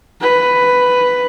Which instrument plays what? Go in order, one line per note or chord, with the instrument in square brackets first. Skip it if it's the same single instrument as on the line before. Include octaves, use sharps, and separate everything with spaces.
[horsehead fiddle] B4